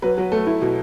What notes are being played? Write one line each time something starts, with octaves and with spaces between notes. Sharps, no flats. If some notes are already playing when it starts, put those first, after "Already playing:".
F#3 B4
F#3
A3
E4
B2